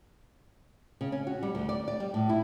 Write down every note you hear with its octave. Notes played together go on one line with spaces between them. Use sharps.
C#3
C#4
F#4
G3
D2
D5
D5
G3
A2
E4